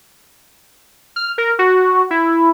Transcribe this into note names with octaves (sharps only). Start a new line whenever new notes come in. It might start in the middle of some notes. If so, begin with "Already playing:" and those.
F6
A#4
F#4
E4